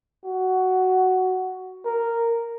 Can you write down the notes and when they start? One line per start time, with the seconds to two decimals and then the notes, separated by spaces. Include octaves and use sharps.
0.25 F#4
1.85 A#4